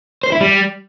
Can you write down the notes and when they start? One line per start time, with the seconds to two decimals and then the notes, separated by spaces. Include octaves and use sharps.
0.23 C5
0.32 E4
0.41 G3